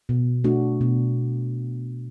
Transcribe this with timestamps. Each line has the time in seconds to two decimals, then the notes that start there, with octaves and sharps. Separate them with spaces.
0.09 B2
0.44 A3 D4 F#4
0.81 B2